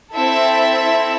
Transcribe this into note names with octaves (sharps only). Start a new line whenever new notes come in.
C4 E4 A4 E5